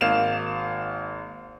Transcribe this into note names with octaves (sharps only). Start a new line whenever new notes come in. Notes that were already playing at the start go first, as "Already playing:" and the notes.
G#1 A#3 F5 E7 F7